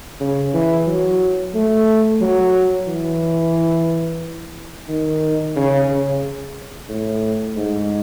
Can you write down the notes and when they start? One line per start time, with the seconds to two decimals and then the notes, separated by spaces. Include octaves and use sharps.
0.20 C#3
0.54 E3
0.87 F#3
1.54 A3
2.21 F#3
2.87 E3
4.89 D#3
5.56 C#3
5.89 C#3
6.89 A2
7.56 G#2